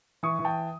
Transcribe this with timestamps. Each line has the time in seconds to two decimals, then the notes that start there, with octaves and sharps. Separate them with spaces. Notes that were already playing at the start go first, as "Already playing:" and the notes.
0.23 E3 C#6 D#6
0.39 E3
0.45 G5 A5